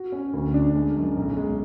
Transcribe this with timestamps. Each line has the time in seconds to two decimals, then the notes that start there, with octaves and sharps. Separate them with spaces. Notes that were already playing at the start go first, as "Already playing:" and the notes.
Already playing: F#4
0.12 C#4
0.34 D2
0.54 D4
0.75 G#3
0.96 F#2
1.17 B1
1.37 G#3